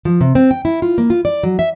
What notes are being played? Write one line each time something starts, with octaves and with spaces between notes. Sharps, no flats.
F3
C3
C4
G5
E4
F4
A#3
F4
D5
F#3
E5